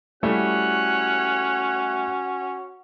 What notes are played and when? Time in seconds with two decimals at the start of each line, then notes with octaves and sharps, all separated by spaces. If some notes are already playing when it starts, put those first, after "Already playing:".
0.23 G3 A3 C#4 E4 F#4 F#6